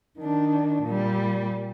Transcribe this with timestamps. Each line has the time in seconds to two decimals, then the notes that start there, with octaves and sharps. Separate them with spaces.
0.19 D#3 D4
0.84 A#2 G3